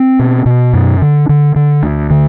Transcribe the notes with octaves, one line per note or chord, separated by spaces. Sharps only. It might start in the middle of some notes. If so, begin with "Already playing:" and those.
Already playing: C4
B2
B2
F#2
D3
D3
D3
D2
D3